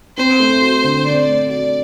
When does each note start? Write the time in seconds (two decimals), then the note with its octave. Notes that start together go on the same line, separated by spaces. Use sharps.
0.17 C4 C5
0.40 A3
0.61 F#4
0.84 D3
1.05 C4 D5
1.28 A3
1.49 F#4 D5